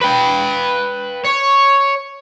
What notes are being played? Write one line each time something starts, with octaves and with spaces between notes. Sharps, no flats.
B4 G5
C#5